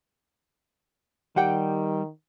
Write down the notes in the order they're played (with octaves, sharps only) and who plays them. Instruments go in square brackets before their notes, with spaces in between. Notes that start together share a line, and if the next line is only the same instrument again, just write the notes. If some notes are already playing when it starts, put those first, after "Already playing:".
[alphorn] D#3 [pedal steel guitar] G3 [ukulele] G4 F#5 G5